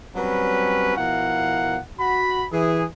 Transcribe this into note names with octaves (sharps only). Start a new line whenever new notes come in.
F#3 G3 C4 C#4 B4
B2 F3 E4 A#4 F5 F#5
F#4 B5
E3 G#4